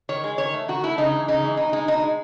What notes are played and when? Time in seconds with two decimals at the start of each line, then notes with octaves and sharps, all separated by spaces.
0.09 D#3 C#5
0.24 G#3
0.38 D#3 C#5
0.54 A3
0.68 D#3 F#4
0.84 A3 E4
0.98 C#3 D#4
1.12 E3 G#3
1.28 C#3 D#4
1.43 E3 G#3
1.57 B2 D#4
1.72 G#3 D#4
1.88 B2 D#4
2.02 G#3